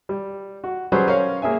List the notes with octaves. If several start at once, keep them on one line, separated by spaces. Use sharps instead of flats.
G3
F#4
F#3 G3 C#4 G#4 B4 C5
C#4 A#4 C#5 F5
A#3 G#4 E5 G#5